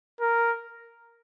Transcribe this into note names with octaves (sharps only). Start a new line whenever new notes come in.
A#4